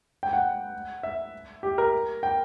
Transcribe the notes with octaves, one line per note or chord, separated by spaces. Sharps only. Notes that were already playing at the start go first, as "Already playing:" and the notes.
G5
F#5
E5
G4
A#4
G5